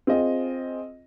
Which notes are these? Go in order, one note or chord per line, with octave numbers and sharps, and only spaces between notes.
C4 F4 G#4 D#5